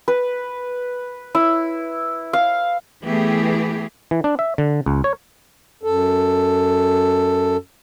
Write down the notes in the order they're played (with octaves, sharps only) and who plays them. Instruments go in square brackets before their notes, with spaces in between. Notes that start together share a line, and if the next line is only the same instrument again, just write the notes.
[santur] B4
E4
F5
[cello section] E3 A3 B3 G4 G#4
[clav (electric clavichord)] E3
D4
E5
D3
C#2
C#5
[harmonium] F#2 A4